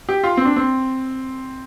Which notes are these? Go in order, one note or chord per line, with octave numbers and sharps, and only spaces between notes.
G4
F4
C4
D4
C4